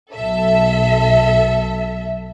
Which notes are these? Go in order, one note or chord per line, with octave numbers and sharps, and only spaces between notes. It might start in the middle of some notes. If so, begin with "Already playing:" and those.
B1 A4 E5